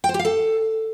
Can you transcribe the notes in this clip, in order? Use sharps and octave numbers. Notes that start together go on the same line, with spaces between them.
G5
C5
G4
F5
A4